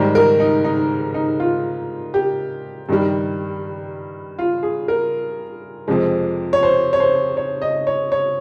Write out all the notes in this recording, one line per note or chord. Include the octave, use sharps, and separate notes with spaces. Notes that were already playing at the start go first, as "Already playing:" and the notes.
Already playing: G#2 D#3 G3
A#4
D#4
D#4
D#4
F4
G4
G2 D#3 G3
F4
G#4
A#4
F2 C3 F3 G#3
C#5
C5
C#5
C5
C#5
D#5
C#5
C#5